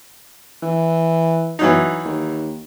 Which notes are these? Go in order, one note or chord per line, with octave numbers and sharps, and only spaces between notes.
E3
E3 F#3 D#4
D#2